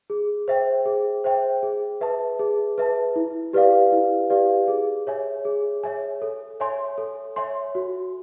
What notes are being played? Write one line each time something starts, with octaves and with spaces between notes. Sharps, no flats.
G#4
C5 E5 G5
G#4
C5 E5 G5
G#4
B4 E5 A5
G#4
B4 E5 A5
E4
G4 B4 D5 F5
E4
G4 B4 D5 F5
G#4
C#5 E5 G#5
G#4
C#5 E5 G#5
A4
C#5 E5 G#5 C6
A4
C#5 E5 G#5 C6
F#4